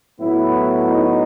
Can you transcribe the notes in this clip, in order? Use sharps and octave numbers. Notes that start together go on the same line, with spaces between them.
A2 F#3 B3 E4
D#4